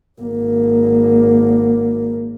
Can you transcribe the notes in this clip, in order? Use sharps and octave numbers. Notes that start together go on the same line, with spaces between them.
G#1 A#3